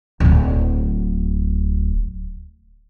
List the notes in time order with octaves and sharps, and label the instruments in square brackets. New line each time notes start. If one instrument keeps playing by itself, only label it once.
[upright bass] D1 F#3